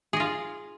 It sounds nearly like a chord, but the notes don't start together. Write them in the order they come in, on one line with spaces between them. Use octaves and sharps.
G#4 D#5 F4